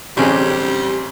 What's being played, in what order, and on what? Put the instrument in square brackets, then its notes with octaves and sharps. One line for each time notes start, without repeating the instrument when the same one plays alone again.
[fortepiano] A1 C4 G#4 [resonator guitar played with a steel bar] D3 F#3 C#4 [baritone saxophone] G3